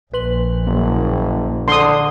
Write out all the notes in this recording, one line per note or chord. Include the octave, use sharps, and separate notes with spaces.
A#1 B4 C6 F#7
F#1 A#3
D3 C6 D#6